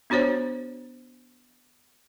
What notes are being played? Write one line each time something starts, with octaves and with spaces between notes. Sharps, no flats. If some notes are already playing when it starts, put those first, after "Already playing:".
B3 D4 F#4 C5 C#5